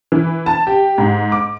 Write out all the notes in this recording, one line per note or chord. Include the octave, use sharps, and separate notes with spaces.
E3
A5
G4
G#2
D6